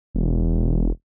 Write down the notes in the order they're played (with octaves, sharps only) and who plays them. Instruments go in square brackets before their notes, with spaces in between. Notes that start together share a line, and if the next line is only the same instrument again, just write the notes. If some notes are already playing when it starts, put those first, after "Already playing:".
[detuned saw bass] E1